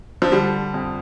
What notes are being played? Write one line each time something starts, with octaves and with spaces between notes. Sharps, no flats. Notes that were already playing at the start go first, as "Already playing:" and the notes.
F3
D3 G3
F2